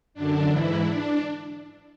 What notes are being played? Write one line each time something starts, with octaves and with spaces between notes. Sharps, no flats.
F#2 D3 D4
G#2 E3 E4
D4